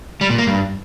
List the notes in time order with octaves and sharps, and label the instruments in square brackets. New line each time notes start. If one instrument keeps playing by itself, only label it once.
[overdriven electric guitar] G3
A#2
A#3
G2